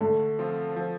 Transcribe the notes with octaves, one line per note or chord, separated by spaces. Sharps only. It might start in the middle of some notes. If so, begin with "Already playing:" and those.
D3 A3 A4
F3 C4 F4
F3